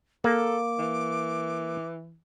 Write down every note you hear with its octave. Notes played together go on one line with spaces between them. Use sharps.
A#3 A4 D6
E3